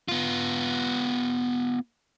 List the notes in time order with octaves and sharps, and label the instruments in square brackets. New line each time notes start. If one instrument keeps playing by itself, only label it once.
[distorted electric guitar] B3 F4